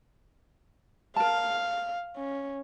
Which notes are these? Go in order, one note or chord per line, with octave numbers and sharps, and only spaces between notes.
A#4 F5 A5
C#4